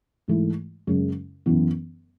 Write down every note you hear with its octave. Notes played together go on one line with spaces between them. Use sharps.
G#2 E3 A3 E4
F#2 C#3 G#3 C#4
F#2 E3 B3